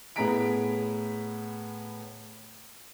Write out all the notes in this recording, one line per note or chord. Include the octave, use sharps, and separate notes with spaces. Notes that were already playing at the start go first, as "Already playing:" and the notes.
A2 B3 G#4 A#5 B6 D7